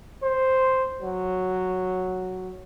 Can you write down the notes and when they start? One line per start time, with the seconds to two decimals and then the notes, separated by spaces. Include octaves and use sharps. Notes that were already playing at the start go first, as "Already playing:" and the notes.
0.23 C5
1.02 F#3